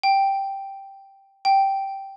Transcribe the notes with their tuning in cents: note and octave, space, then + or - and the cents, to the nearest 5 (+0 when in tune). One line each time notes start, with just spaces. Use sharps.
G5 +0
G5 -5